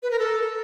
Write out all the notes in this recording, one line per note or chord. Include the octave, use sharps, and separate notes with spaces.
B4
A#4
A4